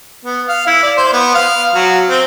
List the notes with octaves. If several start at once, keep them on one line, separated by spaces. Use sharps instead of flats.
B3
F5
E4
D5
C5
B3
F5
F#3
C4